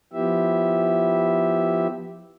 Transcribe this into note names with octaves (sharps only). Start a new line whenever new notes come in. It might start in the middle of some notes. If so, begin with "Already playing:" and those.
F3 B3 E4 G4 E5